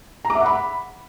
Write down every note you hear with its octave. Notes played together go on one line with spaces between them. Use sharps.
A#5
D6
E5
F#5
B5